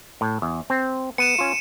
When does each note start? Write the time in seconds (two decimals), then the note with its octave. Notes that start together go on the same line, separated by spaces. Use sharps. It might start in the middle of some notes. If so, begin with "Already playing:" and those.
0.21 A2
0.42 E2
0.70 C4
1.18 B3 C#7 D#7 E7
1.38 C#4 F4